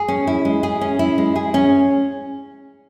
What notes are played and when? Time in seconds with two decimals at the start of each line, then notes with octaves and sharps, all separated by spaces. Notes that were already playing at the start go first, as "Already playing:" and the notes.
Already playing: G#4
0.08 C#4
0.27 E4
0.45 G#3
0.63 G#4
0.81 C#4
0.99 E4
1.18 G#3
1.36 G#4
1.54 C#4